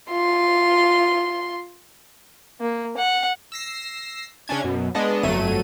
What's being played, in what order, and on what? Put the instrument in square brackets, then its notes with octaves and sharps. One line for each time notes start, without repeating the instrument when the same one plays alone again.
[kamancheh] F4 C6
[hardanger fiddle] A#3
F#5
[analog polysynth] E6 A#6 C7
C#3 C#4 D4 G#6
F#2 B2
G#3 B3 D4 D#5
G1 F2 F#3 A3 D#7